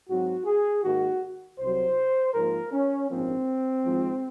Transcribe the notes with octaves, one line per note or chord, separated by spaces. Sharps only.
G#2 F#3 C4 F#4
G#4
G#2 D#3 A#3 F#4
C2 C3 F#3 C5
G#2 F3 A#3 A#4
C#4
A#1 G#2 F3 A#3 C4
G#1 G#2 F3 G#3